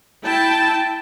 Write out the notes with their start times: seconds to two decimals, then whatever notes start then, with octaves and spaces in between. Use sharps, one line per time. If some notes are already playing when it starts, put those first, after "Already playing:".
0.23 E4 G5 A5